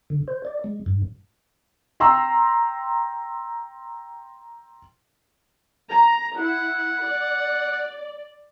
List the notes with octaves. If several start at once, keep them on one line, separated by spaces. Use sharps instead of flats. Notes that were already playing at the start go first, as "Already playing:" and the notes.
D3
C5
D5
G#3
G2
G5 A#5 C6 E6
A#5
E4 F#5
D5